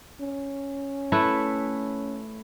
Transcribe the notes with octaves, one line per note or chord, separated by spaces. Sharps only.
C#4
A3 E4 B4